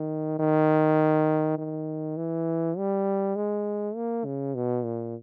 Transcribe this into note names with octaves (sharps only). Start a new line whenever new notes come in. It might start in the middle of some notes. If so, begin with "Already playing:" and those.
Already playing: D#3
D#3
D#3
E3
G3
G#3
A#3
C#3
B2
A#2